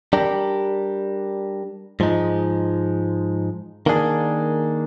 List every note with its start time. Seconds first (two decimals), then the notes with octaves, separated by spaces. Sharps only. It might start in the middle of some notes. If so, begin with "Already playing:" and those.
0.13 G3 D4 G4 A#4
2.00 G#2 F3 G#3 D#4
3.86 D#3 A#3 D4 G#4